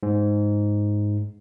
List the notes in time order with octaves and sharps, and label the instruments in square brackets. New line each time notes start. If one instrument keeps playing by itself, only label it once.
[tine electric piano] G#2